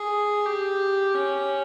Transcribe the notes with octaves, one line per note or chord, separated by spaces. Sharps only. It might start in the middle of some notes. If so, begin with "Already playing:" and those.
Already playing: G#4
G4
C#4